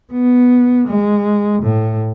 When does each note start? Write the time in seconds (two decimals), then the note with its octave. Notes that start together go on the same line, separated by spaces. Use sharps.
0.13 B3
0.87 G#3
1.63 A2